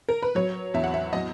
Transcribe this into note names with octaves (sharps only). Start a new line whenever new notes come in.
A#4
B4
F#3 C#5
E2 E5
F#5
E5
F#3 D#5